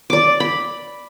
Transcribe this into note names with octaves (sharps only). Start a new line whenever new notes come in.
D5 D6
B5